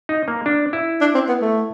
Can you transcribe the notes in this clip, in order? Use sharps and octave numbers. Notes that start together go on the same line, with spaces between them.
D#4
A#3
D4
E4
D4
C4
B3
A3